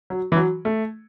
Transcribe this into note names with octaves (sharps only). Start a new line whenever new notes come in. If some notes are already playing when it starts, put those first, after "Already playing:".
F#3
E3
F#3
A3